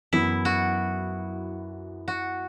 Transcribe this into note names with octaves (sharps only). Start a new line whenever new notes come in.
F#2 E3 B3 E4
F#4
F#4